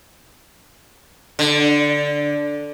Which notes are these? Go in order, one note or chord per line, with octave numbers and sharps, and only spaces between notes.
D3